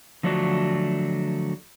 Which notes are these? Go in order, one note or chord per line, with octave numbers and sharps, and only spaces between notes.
D3 F3 F#3 A3 D4 F#4